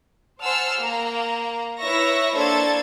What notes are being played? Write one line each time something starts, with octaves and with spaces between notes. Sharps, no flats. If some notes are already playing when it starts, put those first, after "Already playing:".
C5 F#5 G#5 A5 E6 F6
A#3 A#5
E4 B4 C#5 E5 C#6 A#6
A#3 D4 A4 C5 G#6 A6